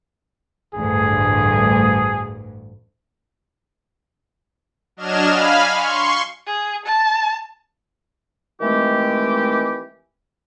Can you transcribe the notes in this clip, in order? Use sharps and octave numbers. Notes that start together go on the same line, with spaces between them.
A1 D2 G2 G#4
F#3 D4 D#5 F6 G#6 E7
F5 G#5 B5 F6
C6 C#6
G#4
A5
D#3 E3 G#3 A3 C4 G4